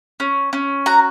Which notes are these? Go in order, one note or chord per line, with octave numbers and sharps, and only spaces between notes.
C#4
C#4
F#4 A#5